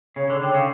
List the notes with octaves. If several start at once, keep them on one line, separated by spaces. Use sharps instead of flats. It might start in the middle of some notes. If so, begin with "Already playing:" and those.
C#3 C#5
D3
D3 G5
C#3